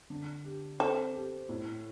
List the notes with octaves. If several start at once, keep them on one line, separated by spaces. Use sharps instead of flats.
D3
G4
C4 A4
G4
A2